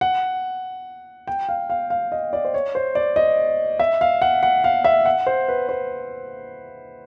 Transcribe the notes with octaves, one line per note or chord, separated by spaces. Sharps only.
F#5
G5
F5
F5
F5
D#5
D5
C5
C#5
C5
D5
D#5
E5
F5
F#5
F#5
F5
E5
F#5
C5
B4
C5